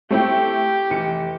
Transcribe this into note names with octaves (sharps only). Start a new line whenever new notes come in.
A3 C4 E4 G4
F1 E3 C#7